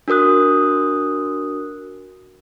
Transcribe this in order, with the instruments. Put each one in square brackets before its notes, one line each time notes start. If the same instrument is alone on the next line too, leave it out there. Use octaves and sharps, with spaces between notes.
[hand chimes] D4 F#4 A#4 D#6 F#6